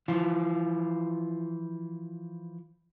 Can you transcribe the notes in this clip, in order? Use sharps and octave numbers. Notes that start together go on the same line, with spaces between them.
E3 F3 F4